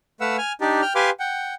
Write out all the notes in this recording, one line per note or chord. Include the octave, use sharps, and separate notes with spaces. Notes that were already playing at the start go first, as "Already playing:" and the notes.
A3 B4 F5 F#5 E6
G#5 F6
D4 D#4 G4 D5
G5 F6
G4 B4 F5 G#5 C6 D6
F#5 G5